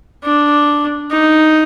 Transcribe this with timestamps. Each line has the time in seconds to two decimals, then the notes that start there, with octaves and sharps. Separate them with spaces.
0.24 D4
1.11 D#4